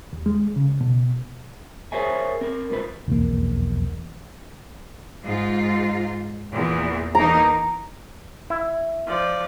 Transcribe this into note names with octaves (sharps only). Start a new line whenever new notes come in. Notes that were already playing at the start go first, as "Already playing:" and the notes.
D#2
G#3
C#3
B2
G#4 A#4 C5 C#5 E5 G#5
C4 A#4
C#2 G#2 F4 B4 C5
F1 B1 E2 A#3
G#2 F4
E2 A#2
E3 A#3 D#4 A#5
E4
F3 D5